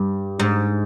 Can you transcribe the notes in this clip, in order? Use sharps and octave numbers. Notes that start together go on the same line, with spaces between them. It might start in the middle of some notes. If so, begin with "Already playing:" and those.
Already playing: G2
G#2